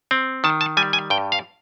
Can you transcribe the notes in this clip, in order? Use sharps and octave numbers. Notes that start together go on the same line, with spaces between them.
C4
D#3 A5
A5
G3 G#5
G#5
G2 G5
F5